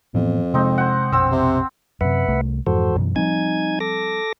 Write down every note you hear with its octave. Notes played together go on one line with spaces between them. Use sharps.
F2 A2 E3 B3
C3 G#3 C4 D#4
C5 F#5
A#1 F2 B2 C4 E6
C3
F#2 C3 B4 E5 F#5
C2 A3
F2 G#2 E3 F#4 A4 C5
F#2 B2 E3
F3 G3 C4 D#4 G#5 G#6
A4 D6 A#6